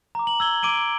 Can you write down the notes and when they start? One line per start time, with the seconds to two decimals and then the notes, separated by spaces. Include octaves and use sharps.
0.15 A#5 D6
0.27 F#7
0.40 E6 G#6 G7
0.63 D6 D7 D#7 G7